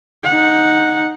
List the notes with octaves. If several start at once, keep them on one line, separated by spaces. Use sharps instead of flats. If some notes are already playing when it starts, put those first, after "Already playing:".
D#4 F#5